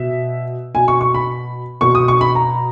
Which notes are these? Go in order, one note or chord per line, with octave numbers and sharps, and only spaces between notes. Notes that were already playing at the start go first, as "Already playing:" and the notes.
Already playing: B2 E5
B2 G#5
C#6
C#6
B5
B2 C#6
D#6
C#6
B5
A#5